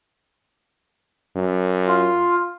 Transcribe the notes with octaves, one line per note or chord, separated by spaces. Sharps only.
F#2
F4